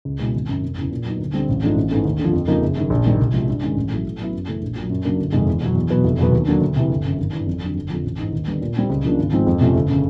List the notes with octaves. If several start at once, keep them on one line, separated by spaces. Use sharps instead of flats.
C#2
B2 G#3 C#4 E4
G#1
F#2 C#3
F1
E2 C#3 E3
A#2
F#3 B3 D#4
D2
D3 G3 C4
A1
G#2 F3 A3 D4
A1
G#2 E3 A3 C#4
D#2
D3
F3
F2
C#3 F3 A#3 D#4
F#1
F#2 D#3
A#1
G#2 D#3 G3
C2
C3 F3 G#3
G2
D#3 G#3 C#4
A1
A2 F#3 A3
A2
F#3 B3 E4
F#2
C#3 E3 A3
A#1
A#2 F#3
F#2
C#3 F#3 A#3 D4
G1
F2 C3 D#3 G#3
E2
B2 F#3
E2
B2 F#3 B3
F1
E2 B2 F#3 B3
D#2
D3 F#3 A#3 D4
D2
C3 E3
G1
F#2 C#3
G#1
G2 E3
F2
D3 F#3
G1
F2 D3 F3
A1
G#2 E3
D#2
D3 G3 B3
A#2
G3 C4 D#4
C#2
C#3 F3 A#3 D4
G#1
G#2 F3 G#3 C4
F2
C3 F3 A3 C#4
G1
C#3